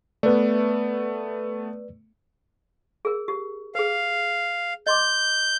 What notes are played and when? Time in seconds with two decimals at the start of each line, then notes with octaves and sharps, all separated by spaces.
0.23 A3 B3 B4 D5
3.05 G#4 A#4
3.28 G4
3.75 G#4 B4 F5
4.87 D#5 C6 D6 G6